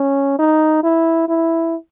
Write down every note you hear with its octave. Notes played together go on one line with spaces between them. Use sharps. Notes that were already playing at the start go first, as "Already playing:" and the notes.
Already playing: C#4
D#4
E4
E4